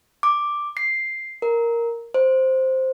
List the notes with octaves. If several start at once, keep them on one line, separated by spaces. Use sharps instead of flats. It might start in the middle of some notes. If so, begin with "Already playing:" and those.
D6
C7
A#4
C5